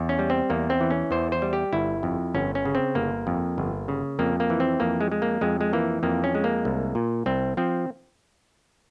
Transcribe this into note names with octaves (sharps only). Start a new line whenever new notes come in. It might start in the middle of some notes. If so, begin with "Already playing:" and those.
Already playing: E2
C#4
G3
C4
E2 A#3
C4
E3
C#4
E2 C5
C5
G3
G4
G1 E4
F2
G1 C#4
C#4
C#3
C4
G1 A#3
F2
G1
C#3
F2 A#3
A#3
E3
C4
F2 A#3
G#3
G#3
A#3
F2 G#3
G#3
E3 A#3
F2 A#3
C#4
G#3
A#3
C2
A#2
C2 C4
F3 C4